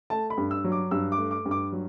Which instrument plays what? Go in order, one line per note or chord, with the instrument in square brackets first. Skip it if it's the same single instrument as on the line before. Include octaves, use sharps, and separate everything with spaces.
[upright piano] A3 A5
B5
G2
E6
F#3
D6
G2 E6
D6
A3
D6
G2
D6
F#3